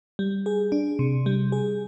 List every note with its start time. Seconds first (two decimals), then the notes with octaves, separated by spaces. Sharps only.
0.19 G3
0.46 G#4
0.72 D4
0.99 C3
1.26 G3
1.52 G#4